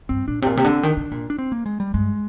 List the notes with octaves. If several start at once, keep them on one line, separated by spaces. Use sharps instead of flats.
G2 C4
A#2 D4
A#2 C3 C4
C3 A#3
D3 C4
D#3 D4
D3
A#2
D4
C4
A#3
G#3
G3
G2 G#3